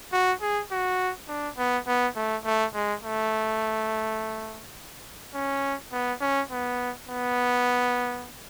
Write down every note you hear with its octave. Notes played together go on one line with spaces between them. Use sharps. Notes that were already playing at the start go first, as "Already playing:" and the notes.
F#4
G#4
F#4
D4
B3
B3
A3
A3
G#3
A3
C#4
B3
C#4
B3
B3